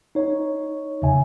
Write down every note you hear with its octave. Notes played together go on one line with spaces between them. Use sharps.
D#4 C#5
D#2 C#3 E5 G#5